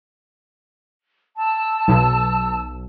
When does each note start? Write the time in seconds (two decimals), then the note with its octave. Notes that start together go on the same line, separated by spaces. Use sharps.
1.37 A5 E6
1.88 B1